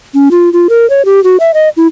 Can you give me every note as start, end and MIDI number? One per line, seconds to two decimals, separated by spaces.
0.14 0.31 61
0.31 0.52 65
0.53 0.67 65
0.69 0.88 70
0.90 1.05 73
1.05 1.22 67
1.24 1.37 66
1.40 1.51 76
1.54 1.69 75
1.77 1.87 64